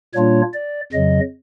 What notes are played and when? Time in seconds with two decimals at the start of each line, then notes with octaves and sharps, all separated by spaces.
0.14 A#2 G3 A#3 D4 F4 C#5
0.54 D5
0.92 F2 C#3 F#3 D#5